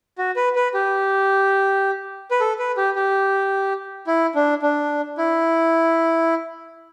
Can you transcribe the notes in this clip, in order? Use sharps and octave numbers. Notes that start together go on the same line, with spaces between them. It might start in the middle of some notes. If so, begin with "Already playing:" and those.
F#4
B4
B4
G4
B4
A4
B4
G4
G4
E4
D4
D4
E4